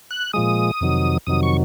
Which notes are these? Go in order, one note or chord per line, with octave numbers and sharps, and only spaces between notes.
F#6
A#2 F3 G#3 D#6
F2 C3 D#3 F#3
F2 C3 D#3 F#3 D#6
C#6